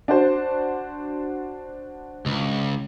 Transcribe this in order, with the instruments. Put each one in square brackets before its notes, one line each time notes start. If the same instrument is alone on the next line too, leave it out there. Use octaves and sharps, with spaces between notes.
[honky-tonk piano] D4 F#4 C5
[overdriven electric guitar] C#2